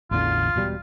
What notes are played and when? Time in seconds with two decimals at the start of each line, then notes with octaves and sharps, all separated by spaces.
0.11 A1 E2 D3 F4
0.56 E1 B2 G3